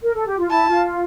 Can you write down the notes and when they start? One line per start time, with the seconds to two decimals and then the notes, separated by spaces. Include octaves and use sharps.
0.02 A#4
0.15 A4
0.26 G4
0.38 F4
0.50 E4 A5
0.68 F4